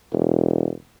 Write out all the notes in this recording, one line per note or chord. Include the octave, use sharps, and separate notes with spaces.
E1